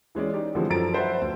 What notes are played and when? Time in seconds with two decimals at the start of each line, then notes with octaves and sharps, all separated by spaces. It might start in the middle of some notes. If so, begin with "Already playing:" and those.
0.15 E3 G#3 C#4 D5
0.34 D#4 G4 D5
0.55 D3 E3 F3 G3 G#3 C4
0.70 F#2 F3 A4 A#5 A6 D7
0.94 B4 C5 D5 E5 F#5
1.21 D2